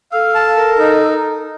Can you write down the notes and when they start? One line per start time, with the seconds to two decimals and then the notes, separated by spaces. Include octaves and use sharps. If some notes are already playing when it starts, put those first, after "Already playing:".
0.12 A4 F5
0.35 A5
0.57 A#4
0.78 D#4